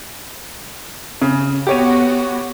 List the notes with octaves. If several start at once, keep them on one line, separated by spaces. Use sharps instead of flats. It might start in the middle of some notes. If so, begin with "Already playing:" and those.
C#3
B3 F#4 G4 C#5 D#7